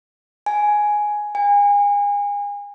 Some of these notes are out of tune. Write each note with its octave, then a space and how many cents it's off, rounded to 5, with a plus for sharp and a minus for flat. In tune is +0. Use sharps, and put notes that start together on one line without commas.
G#5 +5
G#5 -35